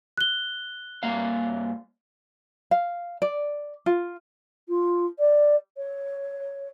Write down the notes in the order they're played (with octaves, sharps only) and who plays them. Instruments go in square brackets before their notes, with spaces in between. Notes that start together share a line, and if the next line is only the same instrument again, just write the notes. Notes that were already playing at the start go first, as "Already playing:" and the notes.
[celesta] F#6 G7
[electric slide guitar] G2 A#3 F5
[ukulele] F5
D5
F4
[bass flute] F4
D5
C#5